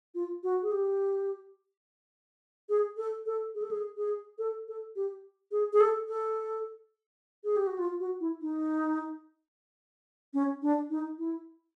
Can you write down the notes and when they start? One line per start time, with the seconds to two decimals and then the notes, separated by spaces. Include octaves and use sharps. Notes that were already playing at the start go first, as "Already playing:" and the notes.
0.15 F4
0.43 F#4
0.63 G#4
0.72 G4
2.69 G#4
2.97 A4
3.26 A4
3.55 G#4
3.62 A4
3.71 G#4
3.97 G#4
4.38 A4
4.68 A4
4.96 G4
5.52 G#4
5.73 G#4
5.80 A4
6.08 A4
7.44 G#4
7.56 G4
7.67 F#4
7.78 F4
8.00 F#4
8.20 E4
8.42 D#4
10.34 C#4
10.62 D4
10.90 D#4
11.19 E4